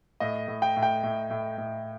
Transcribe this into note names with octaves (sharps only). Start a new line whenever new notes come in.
A2 D#5
A2
G5
A2
G5
A2
A2
A2